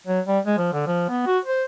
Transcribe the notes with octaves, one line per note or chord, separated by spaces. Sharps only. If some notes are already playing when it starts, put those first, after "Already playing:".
F#3
G3
G#3
F3
D3
F3
B3
F#4
C5